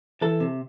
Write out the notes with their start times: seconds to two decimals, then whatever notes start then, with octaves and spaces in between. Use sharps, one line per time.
0.21 E3 A4
0.40 C3